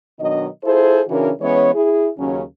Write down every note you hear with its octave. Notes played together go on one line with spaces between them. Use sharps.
B2 D#3 F#3 D4 D#5
E4 F4 G#4 A4 C5
C#3 E3 C#4 D4 F#4 A#4
E3 G#3 B3 C#4 C#5
E4 G#4
D#2 C#3 F#3 C#4